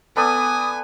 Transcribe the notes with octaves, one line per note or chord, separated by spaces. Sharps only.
B3 A4 D5 G#5 D#6